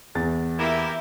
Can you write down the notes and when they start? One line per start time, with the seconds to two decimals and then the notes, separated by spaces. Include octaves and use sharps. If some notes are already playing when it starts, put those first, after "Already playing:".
0.15 E2 A6
0.59 A#3 E4 G4